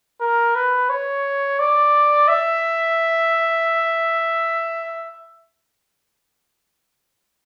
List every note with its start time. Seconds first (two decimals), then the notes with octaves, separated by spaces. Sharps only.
0.20 A#4
0.55 B4
0.89 C#5
1.59 D5
2.28 E5